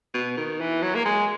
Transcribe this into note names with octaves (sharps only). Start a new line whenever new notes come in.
B2
D#3
E3
F#3
A#3
G#3